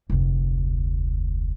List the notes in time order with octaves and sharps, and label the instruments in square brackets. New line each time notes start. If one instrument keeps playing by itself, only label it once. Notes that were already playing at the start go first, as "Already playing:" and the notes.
[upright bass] F1 D2